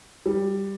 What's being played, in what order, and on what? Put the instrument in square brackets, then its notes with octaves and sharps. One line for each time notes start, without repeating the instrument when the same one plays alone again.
[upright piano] G3